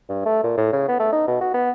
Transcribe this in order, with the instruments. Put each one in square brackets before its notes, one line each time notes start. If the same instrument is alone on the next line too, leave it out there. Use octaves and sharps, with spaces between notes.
[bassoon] G2
A3
A#2
A2
C#3
B3
A3
D#4
B2
F#4
B3